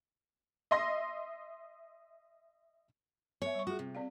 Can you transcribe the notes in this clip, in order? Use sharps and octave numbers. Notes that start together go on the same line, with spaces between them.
D#5 E5 C6 A#6
B3 C#5 E5
G3 C#6
F4 F#4 G#4
C3
C4 D5 F5